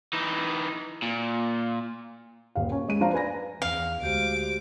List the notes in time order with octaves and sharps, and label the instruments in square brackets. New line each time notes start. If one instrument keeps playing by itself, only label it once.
[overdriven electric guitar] E3 D#4
A#2
[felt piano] D#1 F5
C#4
G#3 D#7
F3 D4 C5 F5 A#5
B4 D5 G#5 B5 A#6
[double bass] E2 [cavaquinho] F5
[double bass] D2 G#3 [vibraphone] F#4 G4 C5 [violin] D6